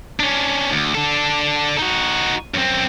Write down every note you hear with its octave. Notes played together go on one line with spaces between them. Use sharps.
C#4 D4
D2
D4 A4
D#4 F#4
F#2 C4